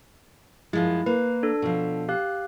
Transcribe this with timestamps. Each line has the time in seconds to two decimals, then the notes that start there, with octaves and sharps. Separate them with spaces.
0.73 F#2 F3 G#3 E4
1.06 A#3 B4
1.43 D4 A4
1.62 B2 F3
2.09 G4 F5 F#6